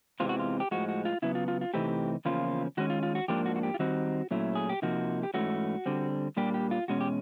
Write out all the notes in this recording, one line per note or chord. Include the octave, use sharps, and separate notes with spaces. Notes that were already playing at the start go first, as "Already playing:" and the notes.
E2 C3 E3 G#3 C4 F4
F#4
F4
G4
A2 F3 G#3 F#4
F#4
F4
C#3 F#3 B3 E4
F4
F4
F4
C3 E3 A3 C4 D#4 G4
E2 C#3 F3 A#3 C#4 F4
D#3 G#3 C#4 F#4
F4
F4
F#4
G#2 F3 A#3 D4 G4
F#4
F#4
G4
F4
D#3 G3 C4 D#4 F#4
A#2 F#3 A3 C#4 E4
G#4
G4
C3 F3 A#3 D#4 F#4
G4
G#2 E3 A3 C#4 F#4
D3 G3 C4
A#2 G3 A#3 D4 G4
G4
F4
E2 B2 G#3 C#4 F#4
G4